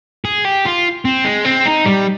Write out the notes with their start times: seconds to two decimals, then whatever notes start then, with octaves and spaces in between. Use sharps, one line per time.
0.25 G#4
0.45 G4
0.66 F4
1.05 C4
1.25 G#3
1.45 C4
1.66 D#4
1.86 G3